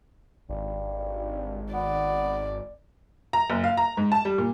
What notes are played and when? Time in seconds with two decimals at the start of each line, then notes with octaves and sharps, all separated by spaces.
0.50 G#1 G2
1.74 B3 D5
3.33 A#5
3.50 F#1
3.64 F5
3.77 A#5
3.97 G#2
4.12 A5
4.25 G3
4.38 A#2